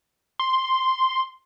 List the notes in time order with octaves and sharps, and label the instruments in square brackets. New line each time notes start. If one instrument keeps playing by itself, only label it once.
[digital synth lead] C6